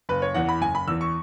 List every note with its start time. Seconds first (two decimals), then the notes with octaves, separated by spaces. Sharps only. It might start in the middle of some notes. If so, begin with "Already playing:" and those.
0.09 F#1 B4
0.22 C#5
0.34 E2 E3 F#5
0.49 B5
0.61 F#1 G#5
0.75 B5
0.88 E2 E3 E6
1.01 C#6